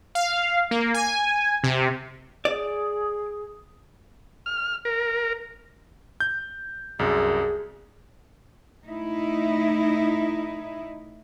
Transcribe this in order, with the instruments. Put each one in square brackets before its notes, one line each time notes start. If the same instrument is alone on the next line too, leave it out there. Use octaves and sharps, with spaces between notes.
[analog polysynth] F5
A#3
G#5
C3
[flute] G#4 [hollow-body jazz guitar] D5
[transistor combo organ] F6
A#4
[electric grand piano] G6
[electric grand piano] C2 F#2 [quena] G#4
[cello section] A2 D#4 E4